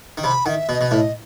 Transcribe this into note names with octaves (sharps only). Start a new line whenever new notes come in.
D#3
C3 B5
D#3 F#5
E5
B2 D#5
B2
A2 E5
D#5